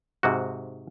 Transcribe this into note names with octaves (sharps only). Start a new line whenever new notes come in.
G#2 C3 F#4